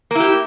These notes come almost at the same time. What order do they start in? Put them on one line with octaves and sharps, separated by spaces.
A#3 E4 G4